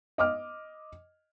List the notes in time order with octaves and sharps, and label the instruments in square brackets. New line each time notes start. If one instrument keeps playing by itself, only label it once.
[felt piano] D#5 D6 F6